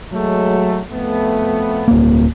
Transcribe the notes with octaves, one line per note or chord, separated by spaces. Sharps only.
F#3 G#3 A3
F2 A3 B3
D1 A#3